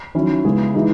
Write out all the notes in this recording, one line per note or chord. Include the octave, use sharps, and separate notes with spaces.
D#3 F#3 C#4 E4
C#3 G#3 B3 E4 G#4
E3 G#3 D#4